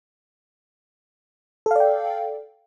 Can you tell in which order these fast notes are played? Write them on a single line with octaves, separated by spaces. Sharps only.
A4 F5 D5 G5